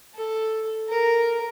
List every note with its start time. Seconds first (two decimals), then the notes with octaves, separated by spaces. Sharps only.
0.15 A4
0.89 A#4